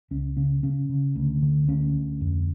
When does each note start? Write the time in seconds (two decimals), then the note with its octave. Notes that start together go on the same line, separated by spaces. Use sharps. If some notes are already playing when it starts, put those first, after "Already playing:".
0.11 C#2 C#4
0.37 C#3 C#4
0.63 C#3 C#4
0.89 C#3
1.16 D2
1.42 D3
1.68 D2 C#4
1.95 D2
2.21 F2